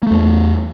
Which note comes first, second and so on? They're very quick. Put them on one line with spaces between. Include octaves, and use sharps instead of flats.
A#3 A3 E2